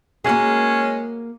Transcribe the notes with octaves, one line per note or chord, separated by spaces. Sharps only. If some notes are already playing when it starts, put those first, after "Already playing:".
G#3 A#3 C#4 F#4 G#4